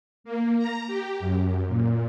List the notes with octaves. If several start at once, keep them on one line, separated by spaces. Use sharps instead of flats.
A#3
A#5
G4
F#2
A#2